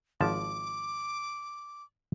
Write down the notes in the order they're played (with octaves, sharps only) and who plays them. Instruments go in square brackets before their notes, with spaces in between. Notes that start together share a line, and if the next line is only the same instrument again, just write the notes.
[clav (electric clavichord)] G#1 F3 A5 [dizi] D6